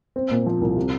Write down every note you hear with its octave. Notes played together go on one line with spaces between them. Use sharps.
C4
A#2
F3
C2
C3